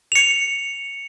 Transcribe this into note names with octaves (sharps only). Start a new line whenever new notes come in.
C#7 F7